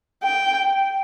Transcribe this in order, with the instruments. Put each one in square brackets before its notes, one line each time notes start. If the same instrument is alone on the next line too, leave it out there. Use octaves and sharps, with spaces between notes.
[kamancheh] G5